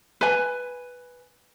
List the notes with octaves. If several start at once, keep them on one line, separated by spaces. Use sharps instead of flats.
B4 G#5